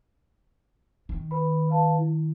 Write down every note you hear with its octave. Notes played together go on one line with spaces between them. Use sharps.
D#3
B4 B5
B4 F5 A5
E4